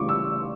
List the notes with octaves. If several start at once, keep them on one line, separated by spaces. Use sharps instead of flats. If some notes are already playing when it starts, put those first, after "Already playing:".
Already playing: C#2 C#3 E3 G3 C#6 D6
E6